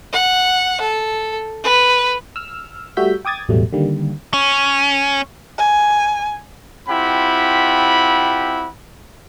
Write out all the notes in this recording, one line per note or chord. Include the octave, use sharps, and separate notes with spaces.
F#5
A4
B4
E6 F6
G3 A3 F#4 E5 G6 B6
G5 D6 D#6 G#6 A6
A1 E2 B2 F#3 G3 A3
D3 D#3 G3 A#3
C#4
G#5
C4 E4 F4 G4 F#5 B5